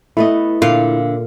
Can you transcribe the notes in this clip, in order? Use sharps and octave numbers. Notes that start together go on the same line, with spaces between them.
A3 B3 E4 D#5
A#2 D3 F5